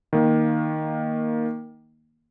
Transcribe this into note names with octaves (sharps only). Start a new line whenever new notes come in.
D#3 A#3